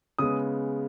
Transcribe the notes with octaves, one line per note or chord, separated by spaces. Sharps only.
C#3 G#3 B3 D#6